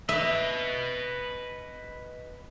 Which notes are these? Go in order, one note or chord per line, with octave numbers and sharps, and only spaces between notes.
B4 D#5 E5